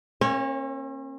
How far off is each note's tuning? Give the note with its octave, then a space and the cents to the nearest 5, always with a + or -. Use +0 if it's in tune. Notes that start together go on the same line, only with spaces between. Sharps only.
A#3 +0 C#4 -45 C#5 +0